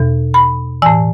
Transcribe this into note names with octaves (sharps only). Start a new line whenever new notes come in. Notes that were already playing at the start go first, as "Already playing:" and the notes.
Already playing: E2 B2
B5
A2 E3 G#5